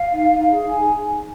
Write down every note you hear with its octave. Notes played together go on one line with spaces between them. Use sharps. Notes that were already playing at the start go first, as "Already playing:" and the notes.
Already playing: F5
D#4
D#4
G#4
D#4 G#5